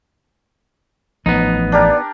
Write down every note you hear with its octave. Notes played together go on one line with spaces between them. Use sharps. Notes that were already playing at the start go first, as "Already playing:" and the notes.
A1 F3 B3 D#4
D4 G4 A#4 D5